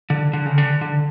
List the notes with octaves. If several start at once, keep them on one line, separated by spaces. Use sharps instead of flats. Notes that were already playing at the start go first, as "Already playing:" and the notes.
D3
D3
C#3
D3
D3